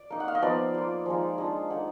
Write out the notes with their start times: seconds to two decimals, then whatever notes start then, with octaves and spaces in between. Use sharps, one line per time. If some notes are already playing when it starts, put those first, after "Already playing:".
Already playing: D5
0.11 A#3 D#4
0.20 F#5
0.28 F5
0.35 D#5
0.42 F3 B3 D#4 D5
0.74 A#3 F4
1.06 F3 G#3 D#4
1.38 G#3 D4 F4 D#5
1.70 A#3 D#4 F#5